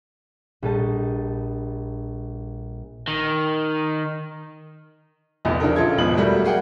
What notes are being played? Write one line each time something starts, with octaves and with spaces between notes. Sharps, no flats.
A#1 G3 A4 D#5 A5 G6
D#3
F1 A#1 E2
C#3 F3 D4 A4 A#4
A#1 F4 A4 G#6
G#1 E2 B2 F3 B4 F#7
F#3 G3 A3 A#3 E4
A#3 G#4 F#5 G5